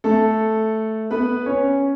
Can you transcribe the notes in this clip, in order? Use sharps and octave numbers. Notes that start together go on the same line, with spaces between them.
A3 A4
B3 B4
C#4 C#5